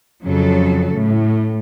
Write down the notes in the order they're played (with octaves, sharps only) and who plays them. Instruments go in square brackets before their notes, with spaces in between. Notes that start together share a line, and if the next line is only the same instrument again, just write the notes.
[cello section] F2 C#3 F#3 A4
A2